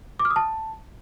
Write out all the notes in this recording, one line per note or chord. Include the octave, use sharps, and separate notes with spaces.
D6
F6
D#6
A5